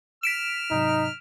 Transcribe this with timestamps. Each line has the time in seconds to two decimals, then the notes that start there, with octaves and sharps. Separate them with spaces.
0.23 F6 B6 D7 E7
0.71 G#2 C3 F#3 D#4